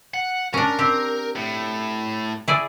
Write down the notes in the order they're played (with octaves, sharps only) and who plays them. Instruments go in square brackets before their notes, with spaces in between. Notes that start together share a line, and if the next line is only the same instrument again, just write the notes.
[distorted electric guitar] F#5
[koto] C#4 D4 [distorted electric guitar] A#4
[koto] C4 G4
[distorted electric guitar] A2
[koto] E4 G#4 D5